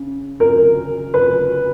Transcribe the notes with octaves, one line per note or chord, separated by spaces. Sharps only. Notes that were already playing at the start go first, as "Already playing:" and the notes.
Already playing: C#3
A#4
B4